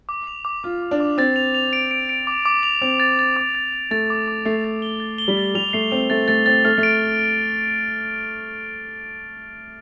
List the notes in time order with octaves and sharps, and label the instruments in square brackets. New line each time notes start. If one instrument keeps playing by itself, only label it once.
[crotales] D6
F7
D6
[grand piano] F4 [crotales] D6
[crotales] D6
[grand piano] D4
[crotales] D6
[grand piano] C4 [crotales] A6
[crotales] F7
F7
D7
D7
D7
D6
D6
F7
[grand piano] C4 [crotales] F7
[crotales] A6
A6
D6
A6
A6
[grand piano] A3 [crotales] A6
[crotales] D6
D6
[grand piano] A3 [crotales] C7
[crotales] A6
G7
A6
G7
[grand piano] G3
[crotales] A6
[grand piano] G3 [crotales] F7
[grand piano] A3 [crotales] C7
[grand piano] C4 [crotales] F7
[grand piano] A3 [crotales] A6
[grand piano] A3 [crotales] A6
[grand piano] C4 [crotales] A6
[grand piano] A3 [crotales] F6
[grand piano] A3
[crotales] D7